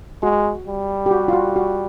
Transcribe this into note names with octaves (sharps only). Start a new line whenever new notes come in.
G#3 F#4
G3
G4
F#4
F4
F#4
F#4